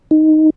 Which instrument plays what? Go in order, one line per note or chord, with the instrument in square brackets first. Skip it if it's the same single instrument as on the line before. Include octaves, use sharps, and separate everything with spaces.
[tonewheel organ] D#4